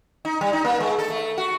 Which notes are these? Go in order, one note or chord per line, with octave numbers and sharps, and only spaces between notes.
D#4
G3
D#4
A#3
G#3
A4
A3
F#4